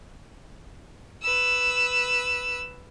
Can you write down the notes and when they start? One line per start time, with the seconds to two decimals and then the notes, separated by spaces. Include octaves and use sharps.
1.23 B4 E6